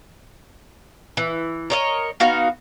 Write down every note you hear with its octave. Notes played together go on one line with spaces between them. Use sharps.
E3
A#4 C#5 D#5
B3 D#4 F#4 F5